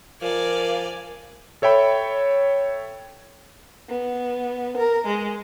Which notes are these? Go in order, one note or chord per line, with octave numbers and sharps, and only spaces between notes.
F3 A#4 D5 F5 G#5
A4 C#5 E5 G5 B5
B3
A#4
G#3